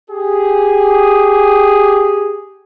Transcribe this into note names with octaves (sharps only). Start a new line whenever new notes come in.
G4 G#4